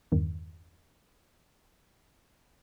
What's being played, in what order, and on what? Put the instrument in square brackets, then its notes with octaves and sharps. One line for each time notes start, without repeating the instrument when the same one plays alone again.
[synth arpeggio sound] E2 G2 D#3